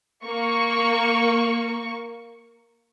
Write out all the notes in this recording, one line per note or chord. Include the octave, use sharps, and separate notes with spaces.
A#3 C#6